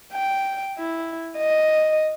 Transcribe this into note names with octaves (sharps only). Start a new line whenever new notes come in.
G5
E4
D#5